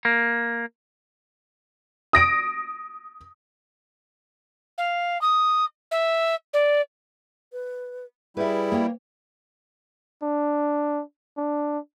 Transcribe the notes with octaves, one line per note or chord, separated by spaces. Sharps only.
A#3
D#6 A#6 D7
F5
D#6
E5
D5
B4
G3 E4 G#4 B4 E5
A#3 C#5 G5
D4
D4